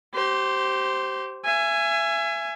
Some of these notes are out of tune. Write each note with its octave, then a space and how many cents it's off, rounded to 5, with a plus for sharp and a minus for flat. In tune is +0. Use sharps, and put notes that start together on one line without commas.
G4 -25 C5 +0
E5 +30 G#5 +0